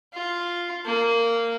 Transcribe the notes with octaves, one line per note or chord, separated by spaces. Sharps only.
F4
A#3